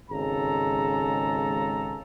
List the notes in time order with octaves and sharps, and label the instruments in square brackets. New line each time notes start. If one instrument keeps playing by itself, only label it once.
[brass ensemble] G#1 C#3 G#3 A4 A#5